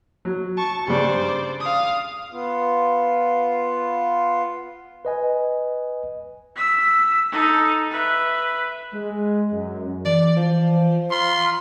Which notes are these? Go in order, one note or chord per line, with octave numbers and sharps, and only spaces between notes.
F#3
A5 C#6
G2 C#3 C5 D5
F5 D#6
B3 F4
B4 D#5 G#5
E6 B6
D#4 A4
B4 E5
G#3
F#2
E3 D5
F3
F4 C6 F6